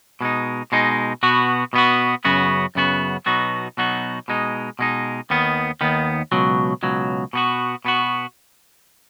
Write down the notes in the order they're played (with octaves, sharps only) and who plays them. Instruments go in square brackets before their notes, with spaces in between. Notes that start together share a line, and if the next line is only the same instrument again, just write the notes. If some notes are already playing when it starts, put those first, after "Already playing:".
[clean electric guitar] B2 G#3 D#4
B2 G#3 D#4
B2 B3 F#4
B2 B3 F#4
F#2 C#3 B3 F#4
F#2 C#3 B3 F#4
B2 F#3 B3 D#4 F#4
B2 F#3 B3 D#4 F#4
B2 G#3 D#4
B2 G#3 D#4
D#2 D#3 B3
D#2 D#3 B3
C#2 B2 F#3
C#2 B2 F#3
B2 B3 F#4
B2 B3 F#4